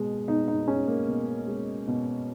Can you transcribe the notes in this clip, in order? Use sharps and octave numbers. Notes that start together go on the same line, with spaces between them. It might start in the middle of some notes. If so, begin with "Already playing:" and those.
Already playing: B2 G#3
B2 D#4
D#4
G#3 C#4
A#3
B2
G#3
B2